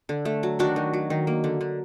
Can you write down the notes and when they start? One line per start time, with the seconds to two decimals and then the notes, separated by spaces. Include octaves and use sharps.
0.09 D3
0.25 A3
0.43 F#3
0.59 D#3 D4 F#4
0.76 D#3
0.93 F#3
1.10 D#3
1.27 A#3
1.44 D3
1.61 D3